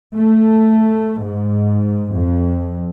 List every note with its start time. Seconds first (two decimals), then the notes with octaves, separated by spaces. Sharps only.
0.15 A3
1.22 G#2
2.16 F2